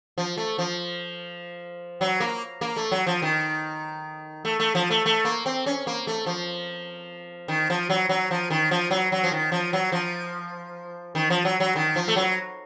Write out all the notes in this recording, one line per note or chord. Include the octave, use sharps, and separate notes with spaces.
F3
A3
F3
F#3
A#3
A#3
A3
F#3
F3
D#3
A3
A3
F3
A3
A3
A#3
C4
C#4
A#3
A3
F3
D#3
F3
F#3
F#3
F3
D#3
F3
F#3
F#3
F3
D#3
F3
F#3
F3
D#3
F3
F#3
F#3
D#3
F3
A3
F#3